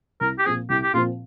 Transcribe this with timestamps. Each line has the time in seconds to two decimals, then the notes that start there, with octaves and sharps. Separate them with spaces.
0.21 C2 A#4
0.39 G4
0.45 A#2 F3 C4 G#4
0.70 C2 G4
0.83 G4
0.94 A#2 F4
0.96 F3 C4